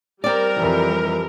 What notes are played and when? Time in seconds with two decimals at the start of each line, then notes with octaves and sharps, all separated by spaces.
0.24 G3 C4 A#4 D5
0.56 F2 E3